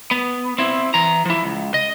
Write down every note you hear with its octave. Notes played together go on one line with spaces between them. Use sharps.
B3
C4 E4
E3 A#5
F3 E4
C#2
D#5